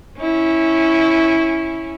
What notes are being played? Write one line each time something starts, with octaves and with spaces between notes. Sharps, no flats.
C#4 E4